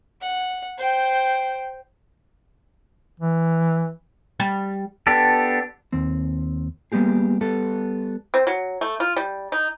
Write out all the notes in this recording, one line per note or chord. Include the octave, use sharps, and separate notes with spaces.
F#5
C5 G5
E3
G3
B3 D4 G4 A4
D#2 C4
G3 A#3 B3 G4 G#4
G3 B3 A4
C4
F#3
A3
F4
G3
D#4